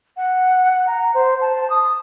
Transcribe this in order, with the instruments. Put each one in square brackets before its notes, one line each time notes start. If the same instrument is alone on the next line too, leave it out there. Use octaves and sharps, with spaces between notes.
[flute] F#5
A#5
C5
A5
D#6